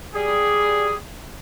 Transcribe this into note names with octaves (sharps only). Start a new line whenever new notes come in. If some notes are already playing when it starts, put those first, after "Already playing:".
G3 G#4